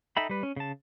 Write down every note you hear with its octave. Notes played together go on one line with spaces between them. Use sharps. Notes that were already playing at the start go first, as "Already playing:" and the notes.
D#4 A4 E5 G5 B5
G3 B4
C#4
C#3 A5